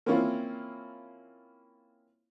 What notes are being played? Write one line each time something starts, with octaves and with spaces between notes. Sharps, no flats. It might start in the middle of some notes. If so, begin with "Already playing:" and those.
A#3 C4 C#4 E4 F4